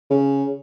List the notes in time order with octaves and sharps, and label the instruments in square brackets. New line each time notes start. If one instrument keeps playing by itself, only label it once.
[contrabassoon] C#3